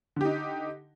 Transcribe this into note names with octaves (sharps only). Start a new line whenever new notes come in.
D3 D#4 G4